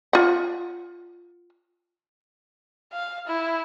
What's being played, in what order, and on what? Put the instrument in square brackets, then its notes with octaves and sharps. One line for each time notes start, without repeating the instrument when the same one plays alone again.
[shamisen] F4 F#5
[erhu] F5
E4